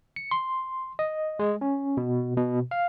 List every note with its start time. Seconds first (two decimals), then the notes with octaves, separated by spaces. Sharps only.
0.16 C#7
0.31 C6
0.99 D#5
1.39 G#3
1.61 C#4
1.97 B2
2.37 B2
2.71 F5